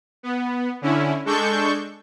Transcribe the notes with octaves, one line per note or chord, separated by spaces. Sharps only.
B3
D3 C#4 E4
G#3 D4 A4 C#6 G6